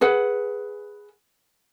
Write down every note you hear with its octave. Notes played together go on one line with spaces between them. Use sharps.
G#4 B4 F#5